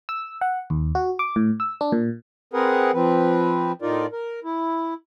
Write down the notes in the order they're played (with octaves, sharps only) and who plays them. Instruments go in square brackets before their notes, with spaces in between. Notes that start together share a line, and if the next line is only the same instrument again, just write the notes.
[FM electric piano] E6
F#5
D#2
F#4
D6
A2
E6
D4
A#2
[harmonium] C4 G#4 A#4 B4 F#5
F3 C4 B4
A2 D#4 F4 A#4 D5
A#4
E4